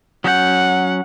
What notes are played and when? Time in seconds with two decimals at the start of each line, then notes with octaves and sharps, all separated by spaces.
0.24 F#3 C#4 F#5 G6